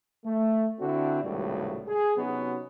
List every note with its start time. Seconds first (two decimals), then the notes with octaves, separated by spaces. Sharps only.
0.25 A3
0.80 D3 C4 D4 E4 F#4
1.23 G#1 C#2 A2 C3 G3 F#4
1.88 G#4
2.17 C3 F#3 B3 C#4 D#4 F#4